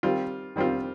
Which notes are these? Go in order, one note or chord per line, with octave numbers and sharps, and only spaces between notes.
D#3 G3 C4 F4
D#3 G3 C4 F4